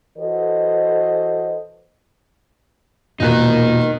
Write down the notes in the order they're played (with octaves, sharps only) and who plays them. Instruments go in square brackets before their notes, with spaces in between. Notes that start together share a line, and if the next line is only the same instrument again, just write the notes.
[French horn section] E3 F#4 A4 C5 D#5
[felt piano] E1 F#6 [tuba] A#2 [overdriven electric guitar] D#4 A#4